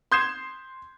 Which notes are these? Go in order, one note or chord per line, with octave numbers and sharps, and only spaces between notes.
C6 D#6 G6 G#6 C7 E7